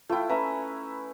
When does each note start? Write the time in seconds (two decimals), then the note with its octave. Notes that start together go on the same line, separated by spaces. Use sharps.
0.09 A3 E4 F4 G5
0.29 C#4 B4 E5 A#5 B5